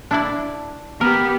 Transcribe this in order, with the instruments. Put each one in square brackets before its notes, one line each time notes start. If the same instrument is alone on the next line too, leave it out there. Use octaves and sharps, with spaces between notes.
[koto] D4 E4 D5
[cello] B3 G4 [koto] A#4